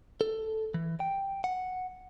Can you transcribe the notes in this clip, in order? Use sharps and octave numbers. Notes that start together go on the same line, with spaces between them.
A4
E3
G5
F#5